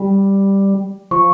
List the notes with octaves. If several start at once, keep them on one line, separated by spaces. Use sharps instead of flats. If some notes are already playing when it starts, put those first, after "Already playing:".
Already playing: G3
F3 C#6